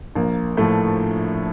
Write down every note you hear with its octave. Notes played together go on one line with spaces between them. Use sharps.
A#1 A#3
A2 F3 A3